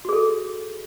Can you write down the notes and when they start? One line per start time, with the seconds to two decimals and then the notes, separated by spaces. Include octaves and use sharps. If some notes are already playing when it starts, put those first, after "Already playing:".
0.05 F#4
0.09 G#4
0.13 A4